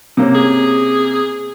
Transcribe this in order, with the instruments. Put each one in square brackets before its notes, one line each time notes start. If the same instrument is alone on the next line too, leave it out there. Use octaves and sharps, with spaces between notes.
[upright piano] C3 A#3 C#4
[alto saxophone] G#4